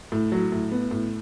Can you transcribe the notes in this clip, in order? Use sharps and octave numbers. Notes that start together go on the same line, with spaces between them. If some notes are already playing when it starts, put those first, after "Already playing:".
A2
F#3
A2
B3
A2